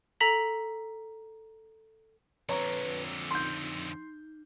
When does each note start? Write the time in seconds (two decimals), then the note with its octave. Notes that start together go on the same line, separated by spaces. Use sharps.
0.20 A4 A#5 A#6 B6 F#7
2.49 F2 D3 B4 C#5 A#5
3.31 D#4 C6 G6